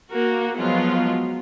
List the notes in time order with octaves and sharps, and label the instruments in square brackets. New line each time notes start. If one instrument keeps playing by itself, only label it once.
[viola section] A#3 F#4
F3 F#3 G#3 B3 F4